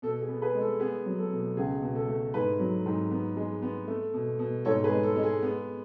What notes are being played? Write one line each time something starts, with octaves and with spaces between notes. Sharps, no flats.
B2 A4
G#4
B3
G#4 B4
G#3
A4
B3 G#4
F#3
A4
B2
C#2 G#4
B2
A4
A3
G#2 G#4 B4
F#3
G#2
B3
G#3
B3
A3
B2
B2
G#2 A4 C#5
G#4 B4
G#3
A4
G#3
G#4
B3